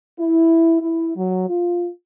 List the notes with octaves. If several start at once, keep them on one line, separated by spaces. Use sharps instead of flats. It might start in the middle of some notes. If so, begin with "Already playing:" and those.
E4
E4
F#3
F4